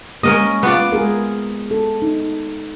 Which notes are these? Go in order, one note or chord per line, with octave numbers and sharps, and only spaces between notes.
G#3 A#3 C#4 A#4 D#5
B3 F4 D5
G#3 G#4 A#4
A4
D#4